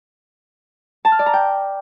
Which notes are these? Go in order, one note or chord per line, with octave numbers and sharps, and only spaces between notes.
A5
F6
D5
A#5
G5